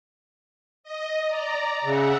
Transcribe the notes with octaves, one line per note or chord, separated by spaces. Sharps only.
D#5
D5 A#5
C#3 E5 F#5